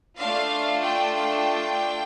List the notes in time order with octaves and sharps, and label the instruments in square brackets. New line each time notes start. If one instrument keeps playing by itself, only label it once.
[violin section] A3 D4 F4 F5
G5
G5